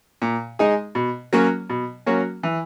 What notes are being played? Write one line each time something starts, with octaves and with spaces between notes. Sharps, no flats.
A#2
G#3 D#4 G#4
B2
F#3 A#3 C#4 F#4
B2
F#3 A#3 C#4 F#4
E3